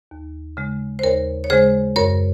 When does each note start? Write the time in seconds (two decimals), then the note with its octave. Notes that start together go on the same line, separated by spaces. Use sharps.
0.11 D#2
0.57 C#3 G#3
0.99 C5
1.03 D#2 A#4 C#5
1.44 C#5
1.50 C#3 G#3 G#4 C5
1.96 F#2 A#4 C#5